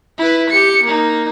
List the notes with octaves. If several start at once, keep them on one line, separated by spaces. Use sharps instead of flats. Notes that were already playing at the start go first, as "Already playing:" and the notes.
E4 B4
G4 C#7
A#3 D#4